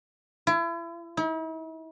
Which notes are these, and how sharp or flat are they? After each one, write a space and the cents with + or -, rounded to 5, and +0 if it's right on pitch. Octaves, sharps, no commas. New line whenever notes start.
E4 +35
E4 -45